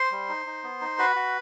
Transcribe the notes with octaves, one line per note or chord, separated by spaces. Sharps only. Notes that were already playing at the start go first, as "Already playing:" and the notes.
Already playing: C5 C6
G3
D#4
D#4
B3
D#4
F#4 B4 B5
F#4